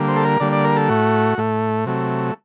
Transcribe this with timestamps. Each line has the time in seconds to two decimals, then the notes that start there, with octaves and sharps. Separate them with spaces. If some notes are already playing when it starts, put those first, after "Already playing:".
Already playing: D3 G3 A#3
0.08 C5
0.17 A4
0.25 A#4
0.40 D3 G3 A#3 D5
0.52 D5
0.65 A#4
0.76 A4
0.89 A2 A3 F#4
1.38 A2 A3
1.86 C3 F#3 A3